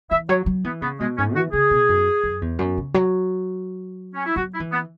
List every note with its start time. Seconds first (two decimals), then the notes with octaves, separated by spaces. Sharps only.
0.11 E3 E5
0.29 F#3 C#5
0.46 F#3
0.64 E3 B3
0.82 C#3 B3
1.00 B2 G#3
1.18 G#2 C#4
1.35 E3 F#4
1.53 C#3 G#4
1.71 B2
1.89 F#2
2.24 F#2
2.41 E2
2.59 F#2
2.77 C#3
2.94 F#3
4.15 C#4
4.26 E4
4.36 F#3 F#4
4.54 E4
4.60 E3
4.72 B3